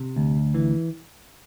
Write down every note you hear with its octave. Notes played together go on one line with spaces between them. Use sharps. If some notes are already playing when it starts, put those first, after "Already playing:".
Already playing: C3
D2
E3